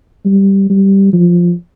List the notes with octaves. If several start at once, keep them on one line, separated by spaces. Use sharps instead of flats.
G3
G3
F3